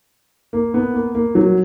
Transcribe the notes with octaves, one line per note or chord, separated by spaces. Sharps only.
A#3
B3
A#3
A#3
F#3